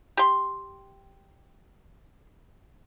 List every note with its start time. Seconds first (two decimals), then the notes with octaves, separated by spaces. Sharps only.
0.17 G4 C6